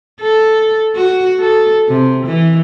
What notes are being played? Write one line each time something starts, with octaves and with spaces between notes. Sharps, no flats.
A4
F#4
A4
C3
E3